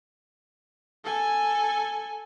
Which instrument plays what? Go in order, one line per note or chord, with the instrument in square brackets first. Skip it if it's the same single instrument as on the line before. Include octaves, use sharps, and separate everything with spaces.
[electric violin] A4 G#5